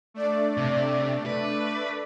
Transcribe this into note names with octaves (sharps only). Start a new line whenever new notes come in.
A3 D4 D5
C3
B4